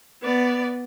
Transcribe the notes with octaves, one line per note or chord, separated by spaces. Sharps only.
B3 D5